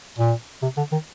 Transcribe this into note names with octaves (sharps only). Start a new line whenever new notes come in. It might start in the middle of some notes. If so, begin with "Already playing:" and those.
A#2
C3
D3
D#3